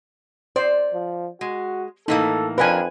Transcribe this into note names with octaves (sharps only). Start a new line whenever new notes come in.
C5 D5
F3
G#3 F#4
A2 E3 A#3 D#4 A4
F2 F3 D4 A#4 B4 G#5